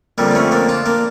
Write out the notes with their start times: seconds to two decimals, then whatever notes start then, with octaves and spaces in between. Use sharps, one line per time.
0.18 F2 D3 F3 G3 A#3
0.31 D4
0.35 A3 C#4
0.51 A#3 D4
0.69 D4 F4
0.86 A#3 D4